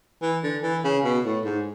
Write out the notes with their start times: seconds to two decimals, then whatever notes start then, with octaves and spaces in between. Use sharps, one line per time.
0.22 E3
0.43 D3
0.63 E3
0.84 C#3
1.05 B2
1.25 A2
1.45 G#2